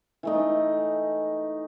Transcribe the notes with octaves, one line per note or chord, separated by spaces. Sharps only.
E3 A3 D#4